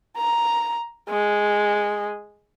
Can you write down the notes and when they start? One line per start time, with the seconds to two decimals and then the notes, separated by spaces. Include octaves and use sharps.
0.17 A#5
1.10 G#3